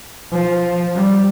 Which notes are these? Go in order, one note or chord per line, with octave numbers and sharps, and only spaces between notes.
F3
G3